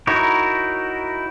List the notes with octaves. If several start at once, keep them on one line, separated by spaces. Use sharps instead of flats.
D#4 E4 F#4 A#4 C#5